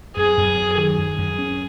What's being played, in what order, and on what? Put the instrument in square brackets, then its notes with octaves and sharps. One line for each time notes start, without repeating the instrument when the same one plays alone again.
[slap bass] F#2 [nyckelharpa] G#4
[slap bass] F#2
F#3
[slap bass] D#3 [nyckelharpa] G#4
[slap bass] F#2
F#2
C#4